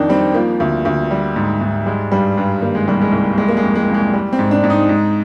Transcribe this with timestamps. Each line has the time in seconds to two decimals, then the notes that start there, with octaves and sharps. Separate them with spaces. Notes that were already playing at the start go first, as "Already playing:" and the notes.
Already playing: F2 D#3 D4 D#4
0.09 G3 C4
0.34 F3 A#3
0.60 D2
0.85 D2
1.11 G3
1.36 G#2
1.61 G#2
1.86 G3 G#3
2.12 G2 G3
2.37 G2
2.61 D#3 A#3
2.75 G#3
2.87 C2 G3
3.01 G#3
3.12 C2
3.38 G3 G#3
3.48 A#3
3.57 G#3
3.63 F2
3.75 G#3
3.89 F2
3.94 G#3
4.13 G3
4.33 C4
4.39 G#2
4.51 D4
4.64 G#2
4.70 D#4
4.89 G#2